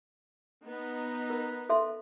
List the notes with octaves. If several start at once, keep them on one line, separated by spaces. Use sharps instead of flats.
B3 D#4
A#4
A4 E5 C6